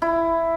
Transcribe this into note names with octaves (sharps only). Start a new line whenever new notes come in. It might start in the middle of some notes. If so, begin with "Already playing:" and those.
E4